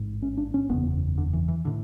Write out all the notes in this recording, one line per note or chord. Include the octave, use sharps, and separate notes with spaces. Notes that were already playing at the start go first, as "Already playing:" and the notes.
Already playing: A1 G#2
C#4
D4
C#4
F#1 E2 C#3 B3
D3
E3
E3
A2 D3